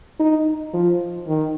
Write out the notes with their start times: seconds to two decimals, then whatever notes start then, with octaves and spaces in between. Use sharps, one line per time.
0.19 D#4
0.73 F3
1.27 D#3